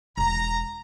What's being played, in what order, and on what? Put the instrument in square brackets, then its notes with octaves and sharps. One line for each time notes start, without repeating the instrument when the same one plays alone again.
[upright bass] E1 [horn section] A#5